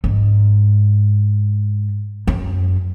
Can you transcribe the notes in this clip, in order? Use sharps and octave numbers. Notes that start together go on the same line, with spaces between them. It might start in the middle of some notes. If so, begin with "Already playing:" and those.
G#2
F#2